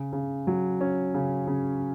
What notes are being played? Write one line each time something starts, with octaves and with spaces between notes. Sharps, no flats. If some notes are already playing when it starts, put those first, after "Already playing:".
Already playing: C#3
C#3
F#3
C#4
C#3
C#3